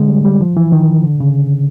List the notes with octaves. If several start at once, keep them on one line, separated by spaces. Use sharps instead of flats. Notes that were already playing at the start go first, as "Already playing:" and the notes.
Already playing: D3 G#3
G3
G3
F3
E3
D#3
D3
C#3